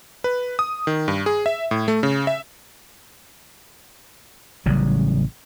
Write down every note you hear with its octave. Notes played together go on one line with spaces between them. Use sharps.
B4
D#6
D#3
G2
G#4
E5
A2
A3
C#3
E5
A1 C#3 F#3 G3